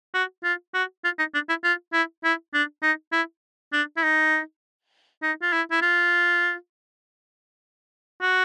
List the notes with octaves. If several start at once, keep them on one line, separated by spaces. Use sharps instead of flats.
F#4
F4
F#4
F4
D#4
D4
E4
F4
E4
E4
D4
D#4
E4
D4
E4
D#4
D#4
F4
E4
E4
F4
F#4